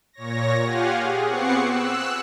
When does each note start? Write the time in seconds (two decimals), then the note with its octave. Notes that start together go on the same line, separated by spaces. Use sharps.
0.13 A#2 C#5 A#6
0.64 F4 G4 F5 F#5 G#5
0.96 G#4
1.26 B3 C4 F#5 C#6 D6 C7
1.64 E6 F#6